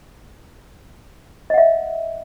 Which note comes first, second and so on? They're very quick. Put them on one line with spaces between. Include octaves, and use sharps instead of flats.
D#5 F#5 E5